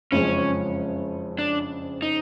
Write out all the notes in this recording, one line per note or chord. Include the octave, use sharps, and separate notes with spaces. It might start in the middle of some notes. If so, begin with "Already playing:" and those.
F#1 F2 C#3 F3 G#3 C#4
D4
D#4